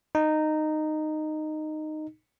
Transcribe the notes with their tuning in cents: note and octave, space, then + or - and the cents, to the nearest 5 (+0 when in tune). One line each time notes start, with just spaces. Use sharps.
D#4 -10